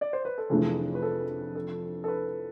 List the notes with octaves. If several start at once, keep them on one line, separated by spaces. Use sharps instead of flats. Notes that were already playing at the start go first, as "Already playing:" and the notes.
D5
C5
B4
A4
F1 F2 E3 A3 D4 G#4
B4
A4
A4
A4
B4